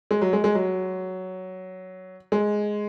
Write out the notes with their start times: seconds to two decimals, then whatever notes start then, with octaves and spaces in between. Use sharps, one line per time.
0.11 G#3
0.21 F#3
0.33 G#3
0.44 G#3
0.55 F#3
2.32 G#3